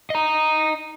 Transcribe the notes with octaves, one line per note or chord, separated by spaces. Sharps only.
D#5 A#5